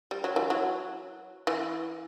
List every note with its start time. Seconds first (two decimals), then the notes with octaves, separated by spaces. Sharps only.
0.11 G3
0.24 F#3
0.36 E3
0.50 F#3
1.47 E3